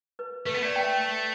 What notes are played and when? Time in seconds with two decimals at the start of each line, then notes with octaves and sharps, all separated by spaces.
0.19 B4
0.46 A3 B4
0.54 B3
0.63 A3 D5
0.76 G5
0.81 E5